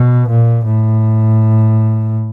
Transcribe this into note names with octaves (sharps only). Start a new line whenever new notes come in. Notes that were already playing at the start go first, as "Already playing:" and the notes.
Already playing: B2
A#2
A2